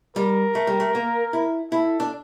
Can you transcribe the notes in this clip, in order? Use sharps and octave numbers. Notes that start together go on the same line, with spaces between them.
G3 A#4
A3
G3
A3
A#3
E4
E4 A4
D4